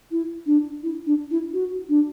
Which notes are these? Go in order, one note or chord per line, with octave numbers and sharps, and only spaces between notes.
E4
D4
E4
D4
E4
F#4
D4